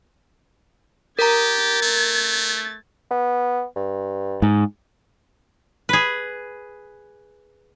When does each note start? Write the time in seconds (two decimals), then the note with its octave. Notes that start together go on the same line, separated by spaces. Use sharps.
1.19 G4 A#4 A#5 G#6 A6
1.82 A3
3.11 B3
3.76 G2
4.42 G#2
5.89 G#4 B4